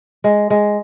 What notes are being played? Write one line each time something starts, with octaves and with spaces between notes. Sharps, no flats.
G#3
G#3